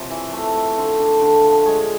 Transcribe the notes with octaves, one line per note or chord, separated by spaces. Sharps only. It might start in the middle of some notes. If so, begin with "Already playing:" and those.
Already playing: C3 F3 C#5
E3
A3
A3
D3 C5
D3
D3
F3
G#3 C#5